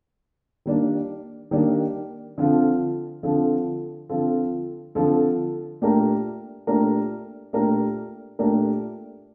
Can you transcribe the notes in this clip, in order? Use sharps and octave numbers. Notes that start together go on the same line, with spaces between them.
D#3 G3 A#3 D4
D#3 G3 A#3 D4
D3 F3 C4 F4 A4
D3 F3 C4 F4 A4
D3 F3 C4 F4 A4
D3 F3 C4 F4 A4
A#2 A3 D4 G4 A#4
A#2 A3 D4 G4 A#4
A#2 A3 D4 G4 A#4
A#2 A3 D4 G4 A#4